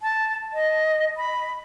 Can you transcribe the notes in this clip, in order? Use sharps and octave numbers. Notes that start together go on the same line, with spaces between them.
A5
D#5
B5